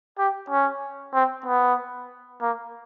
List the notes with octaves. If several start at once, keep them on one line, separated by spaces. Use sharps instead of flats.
G4
C#4
C4
B3
A#3